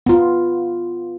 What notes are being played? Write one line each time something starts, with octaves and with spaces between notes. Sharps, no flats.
B3 F4